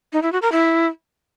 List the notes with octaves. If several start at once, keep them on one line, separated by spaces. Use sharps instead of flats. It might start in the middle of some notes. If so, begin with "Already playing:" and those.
D#4
E4
F#4
A#4
E4